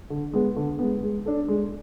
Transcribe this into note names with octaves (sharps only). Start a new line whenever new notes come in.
D3
G#3 B3
D3
G#3 B3
G#3
D4 A4
G#3